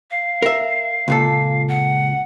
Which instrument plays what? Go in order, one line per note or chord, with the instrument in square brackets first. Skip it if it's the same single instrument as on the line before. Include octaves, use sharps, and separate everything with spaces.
[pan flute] F5
[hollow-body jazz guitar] A#4 E5
C#2 A#2 A4
[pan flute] F#5